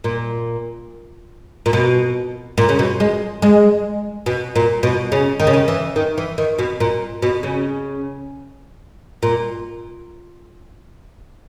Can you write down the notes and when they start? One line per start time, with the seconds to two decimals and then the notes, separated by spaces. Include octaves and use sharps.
0.04 A#2
1.66 A#2
1.73 B2
2.58 A#2
2.69 C#3
2.79 B2
3.00 G#3
3.42 G#3
4.26 B2
4.56 A#2
4.83 B2
5.12 C#3
5.40 D#3
5.47 C#3
5.53 D#3
5.68 E3
5.96 D#3
6.18 E3
6.38 D#3
6.59 B2
6.80 A#2
7.22 B2
7.43 C#3
9.23 A#2